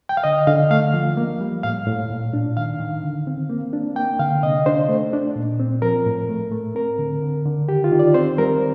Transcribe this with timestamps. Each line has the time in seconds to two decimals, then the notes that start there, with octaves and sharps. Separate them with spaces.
0.09 G5
0.17 F5
0.24 D3 D#5
0.47 D3 F5
0.71 A3 F5
0.94 F3
1.17 A#3
1.41 G3
1.63 A2 F5
1.87 A2
2.10 A#2
2.33 D4
2.57 D#3 F5
2.80 D#3
3.04 D3
3.27 C4
3.50 A#3
3.73 D4
3.96 A#3 G5
4.19 D3 F5
4.43 C3 D#5
4.66 D4 C5
4.89 A3
5.13 D4
5.36 A#2
5.60 C4
5.82 F3 A#4
6.06 A2
6.29 A3
6.52 A3
6.75 C4 A#4
6.99 D3
7.22 D3
7.46 D3
7.68 D#3 G4
7.84 F4
7.92 D#3
7.99 D5
8.14 C4 C5
8.38 G3 A#4